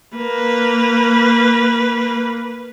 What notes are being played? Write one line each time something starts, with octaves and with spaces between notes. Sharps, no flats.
A#3 B4